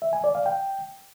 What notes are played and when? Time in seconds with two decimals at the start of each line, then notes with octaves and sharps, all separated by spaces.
0.02 E5
0.13 G#5
0.24 D5
0.35 F5
0.46 G5